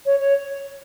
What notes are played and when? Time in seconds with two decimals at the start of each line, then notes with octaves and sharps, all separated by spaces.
0.06 C#5
0.20 C#5